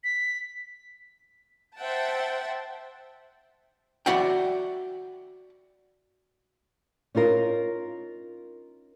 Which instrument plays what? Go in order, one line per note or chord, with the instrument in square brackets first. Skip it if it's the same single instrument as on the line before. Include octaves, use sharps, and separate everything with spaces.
[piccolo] B6
[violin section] C5 E5 F#5 G5 A5
[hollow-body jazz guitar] F#4 D5 E5 F#5 G5
[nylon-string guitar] C#4 D#4 F4 A#4